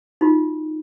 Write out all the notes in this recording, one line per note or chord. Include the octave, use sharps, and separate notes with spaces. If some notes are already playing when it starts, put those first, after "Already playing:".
D#4 F4 F#4